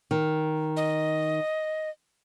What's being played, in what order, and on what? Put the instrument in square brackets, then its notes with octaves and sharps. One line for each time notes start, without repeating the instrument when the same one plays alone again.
[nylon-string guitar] D#3
[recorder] D#5